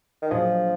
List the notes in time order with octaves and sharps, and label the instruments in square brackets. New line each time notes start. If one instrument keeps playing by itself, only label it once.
[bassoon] D#3
[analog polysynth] A#2 F#3 D4 G#4 D#5 [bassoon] F3